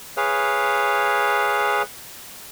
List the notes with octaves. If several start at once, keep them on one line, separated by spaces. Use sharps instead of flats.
G#4 B4 C#5 F5